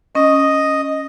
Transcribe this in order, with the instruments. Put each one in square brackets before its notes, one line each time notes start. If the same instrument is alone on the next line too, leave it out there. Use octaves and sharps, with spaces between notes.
[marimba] C#4 [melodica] D#5